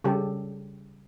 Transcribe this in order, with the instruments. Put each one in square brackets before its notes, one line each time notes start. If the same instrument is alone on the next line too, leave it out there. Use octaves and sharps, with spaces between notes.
[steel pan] C#3 G3 G4 A4